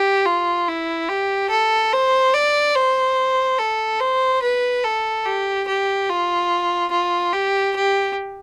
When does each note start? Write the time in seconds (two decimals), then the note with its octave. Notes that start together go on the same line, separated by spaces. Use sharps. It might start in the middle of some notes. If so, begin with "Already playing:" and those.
Already playing: G4
0.26 F4
0.68 E4
1.09 G4
1.50 A4
1.93 C5
2.34 D5
2.75 C5
3.58 A4
4.00 C5
4.42 B4
4.84 A4
5.25 G4
5.67 G4
6.09 F4
6.91 F4
7.33 G4
7.76 G4